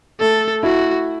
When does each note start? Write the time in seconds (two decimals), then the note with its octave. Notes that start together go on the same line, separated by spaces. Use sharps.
0.20 A3 A4
0.63 E4 F#4